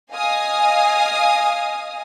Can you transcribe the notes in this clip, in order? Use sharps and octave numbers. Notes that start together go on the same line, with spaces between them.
D#5 F5 G#5 D#6